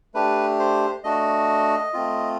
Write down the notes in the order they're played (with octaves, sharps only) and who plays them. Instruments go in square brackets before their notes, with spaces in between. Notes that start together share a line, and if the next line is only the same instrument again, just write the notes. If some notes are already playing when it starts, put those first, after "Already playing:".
[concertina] A3 D4 G4 B4
C5
A3 D4 F#4 D#5
A3 C4 F4